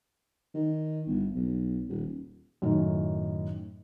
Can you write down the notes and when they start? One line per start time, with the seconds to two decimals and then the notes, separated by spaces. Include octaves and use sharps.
0.54 D#3
1.07 G1
1.35 B1
1.88 D#1
2.62 F#2 A2 D#3